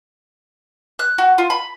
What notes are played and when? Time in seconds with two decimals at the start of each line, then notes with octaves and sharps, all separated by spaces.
0.99 F#6
1.18 F#4
1.38 F4
1.50 B5